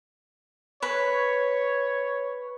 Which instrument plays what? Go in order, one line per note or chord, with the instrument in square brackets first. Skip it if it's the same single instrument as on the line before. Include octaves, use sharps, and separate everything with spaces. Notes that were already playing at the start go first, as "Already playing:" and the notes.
[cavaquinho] B4 [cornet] C#5